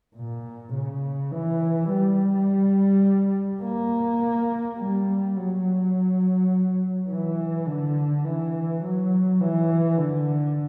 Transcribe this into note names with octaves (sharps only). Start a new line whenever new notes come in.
A#2
C#3
E3
G3
A#3
G3
F#3
E3
D3
E3
F#3
E3
D3